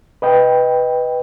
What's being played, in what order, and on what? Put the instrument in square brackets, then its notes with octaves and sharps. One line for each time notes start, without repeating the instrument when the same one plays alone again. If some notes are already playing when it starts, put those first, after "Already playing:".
[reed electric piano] B4 D#5 G5